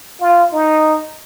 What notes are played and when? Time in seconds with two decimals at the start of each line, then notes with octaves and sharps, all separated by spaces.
0.21 F4
0.53 D#4